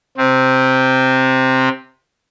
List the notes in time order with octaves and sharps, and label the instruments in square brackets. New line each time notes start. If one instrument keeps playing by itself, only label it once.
[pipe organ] C3 C4